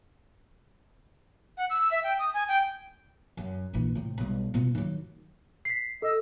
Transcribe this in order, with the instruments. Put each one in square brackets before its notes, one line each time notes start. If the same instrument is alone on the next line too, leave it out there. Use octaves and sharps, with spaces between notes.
[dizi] F#5
E6
E5
G5
D#6
G#5
G5
[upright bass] F#2
A#1 E3
A2 C3
B1 G3
B2 F4
D#3 F#3
[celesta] B6 C7
[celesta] A4 [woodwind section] D#5 E6